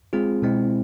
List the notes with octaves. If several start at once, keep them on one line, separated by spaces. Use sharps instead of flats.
G#3 C4 F4 G#4
B2 G#3 C4 E4